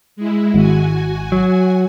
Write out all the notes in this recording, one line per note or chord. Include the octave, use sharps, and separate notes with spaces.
G#3 E4
G#1 F#4 G#5
F#3